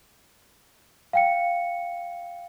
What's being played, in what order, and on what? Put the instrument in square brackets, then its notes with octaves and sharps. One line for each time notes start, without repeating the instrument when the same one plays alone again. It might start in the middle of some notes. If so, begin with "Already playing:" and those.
[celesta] F5 G5 C#7